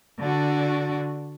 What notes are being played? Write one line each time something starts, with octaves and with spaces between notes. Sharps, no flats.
D3 D4 F#4